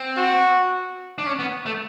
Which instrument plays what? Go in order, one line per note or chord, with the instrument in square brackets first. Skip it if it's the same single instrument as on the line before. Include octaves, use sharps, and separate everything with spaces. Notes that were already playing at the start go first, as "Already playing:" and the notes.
Already playing: [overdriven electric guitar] C4
[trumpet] F#4
[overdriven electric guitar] D4
C#4
B3
A3